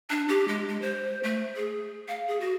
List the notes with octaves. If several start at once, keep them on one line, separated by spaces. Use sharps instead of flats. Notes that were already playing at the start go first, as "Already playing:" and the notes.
D4
G4
G#3
G#3
C5
A3
G#4
F5
G#4
F#4